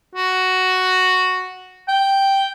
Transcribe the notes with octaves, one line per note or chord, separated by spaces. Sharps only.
F#4
G5